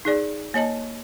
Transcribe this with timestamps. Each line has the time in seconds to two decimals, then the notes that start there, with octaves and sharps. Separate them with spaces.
0.05 D#4 G#4 D5
0.54 A#3 C#5 D#5 A5